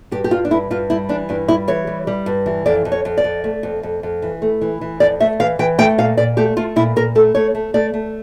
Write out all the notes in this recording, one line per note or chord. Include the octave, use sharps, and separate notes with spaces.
G2 G4
G4
G3 F4
D4
G2 E4
G2 F4
G3 E4
E3 D4
G2 D4
G3 E4
E3 C#5
G3
G3
G2
E3
F2 D5
F2
C#5
F2
D5
F2
A3
F2
F2
F2
E3
A3
E3
E3
F2 D5
A3 E5
E3 F5
E3 G5
A3 G5
A#2 F5
A#2 D5
A3 G4
A3 F4
A#2 E4
A#2 A#4
A3 A4
A3 C#5
A3
A3 D5
A3